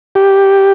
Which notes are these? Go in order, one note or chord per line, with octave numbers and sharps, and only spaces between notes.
G4